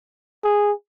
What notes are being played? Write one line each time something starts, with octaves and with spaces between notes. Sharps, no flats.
G#4